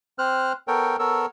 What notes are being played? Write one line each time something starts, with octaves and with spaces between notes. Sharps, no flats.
C4 C5 F6 F#6
B3 A4 A#4 C#5 G5
B3 A4 A#4 C#5 E6